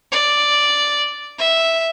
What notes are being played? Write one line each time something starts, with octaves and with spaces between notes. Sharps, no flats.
D5
E5